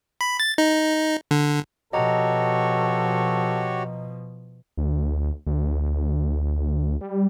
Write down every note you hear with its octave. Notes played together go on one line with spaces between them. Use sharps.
B5
A6
D#4
D3
B2 F3 F#4 G4 A4 C#5 D#5 A#5
D2
D2
G3